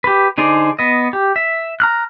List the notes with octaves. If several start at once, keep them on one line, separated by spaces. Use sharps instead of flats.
G4 B4
D3 D#4 G#4 C5 D5
B3 D#5
G4
E5
A#5 F6 F#6